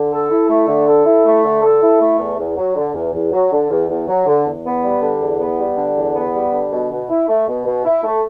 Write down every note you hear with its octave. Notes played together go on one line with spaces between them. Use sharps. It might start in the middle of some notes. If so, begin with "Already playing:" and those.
Already playing: D3
A4
E4
A3
D3
A4
E4
A3
D3
A4
E4
A3
E2
E2
F#3
D3
E2
E2
F#3
D3
E2
E2
F#3
D3
E2
B3
G3
D3
E2
B3
G3
D3
E2
B3
G3
D3
B2
B2
E4
A3
B2
B2
E4
A3